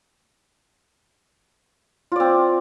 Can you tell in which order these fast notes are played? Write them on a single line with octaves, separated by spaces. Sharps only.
F4 D5 C4